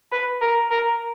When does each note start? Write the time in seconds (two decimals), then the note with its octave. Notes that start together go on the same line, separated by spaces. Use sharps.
0.12 B4
0.41 A#4
0.71 A#4